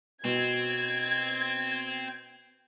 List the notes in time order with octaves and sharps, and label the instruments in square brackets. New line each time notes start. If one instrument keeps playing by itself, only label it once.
[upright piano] B2 [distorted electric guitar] C4 [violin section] G#6